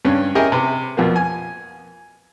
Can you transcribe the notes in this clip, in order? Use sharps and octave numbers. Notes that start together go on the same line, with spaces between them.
G2 C#3 C#4
C#4 E4 G4 G#4 A#4 D#5
C3 B4
F2 B2 F3 A#3 B3
G#5